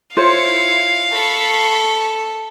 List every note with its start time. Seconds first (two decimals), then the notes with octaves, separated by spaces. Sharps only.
0.17 E4 F4 C5 C#5 F5 C#7
1.12 A4 A5 B5 C#6